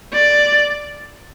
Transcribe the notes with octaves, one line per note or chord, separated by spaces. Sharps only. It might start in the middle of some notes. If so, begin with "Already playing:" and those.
D5